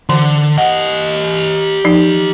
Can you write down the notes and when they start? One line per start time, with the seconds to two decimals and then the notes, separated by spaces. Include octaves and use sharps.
0.09 D3 E3
0.58 G4 D#5 F#5
1.85 F3 D#4